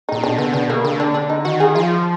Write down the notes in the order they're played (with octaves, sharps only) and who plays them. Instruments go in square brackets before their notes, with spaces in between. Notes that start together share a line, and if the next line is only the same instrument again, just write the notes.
[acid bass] A#2 [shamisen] D#4
[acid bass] B2 [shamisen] D4
[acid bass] D3 [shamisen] B3
[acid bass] B2 [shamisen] D4
[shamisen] A#3
[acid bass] D3 [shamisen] A#3
[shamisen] D4
D4
D#4
[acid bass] D#3 [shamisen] F#4
[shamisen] G#4
[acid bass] F3 [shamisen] F4